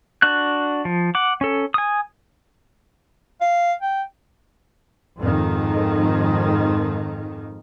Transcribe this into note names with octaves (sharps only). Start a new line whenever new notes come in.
D4 F#4 F#6
F3
F#5 D6
C#4 A4
G#5 D#6
F5
G5
F2 G#2 D#3